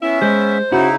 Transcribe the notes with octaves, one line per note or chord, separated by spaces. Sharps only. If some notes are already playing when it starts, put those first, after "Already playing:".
B3 C#4 E4 E5
G#3 G#4 C5
C#3 C#4 D#4 E4 F#4